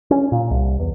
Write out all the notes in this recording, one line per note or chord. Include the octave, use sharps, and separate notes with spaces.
C#4
A#2
C2
E2